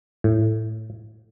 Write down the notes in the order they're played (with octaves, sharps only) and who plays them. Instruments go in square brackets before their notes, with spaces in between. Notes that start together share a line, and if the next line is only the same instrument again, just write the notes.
[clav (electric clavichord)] A2